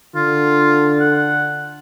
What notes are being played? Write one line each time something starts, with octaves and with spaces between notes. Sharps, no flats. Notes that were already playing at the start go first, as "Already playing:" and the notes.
D3 F4
F#5